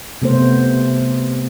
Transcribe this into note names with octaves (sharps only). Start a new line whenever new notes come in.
C3 A3 B3 C5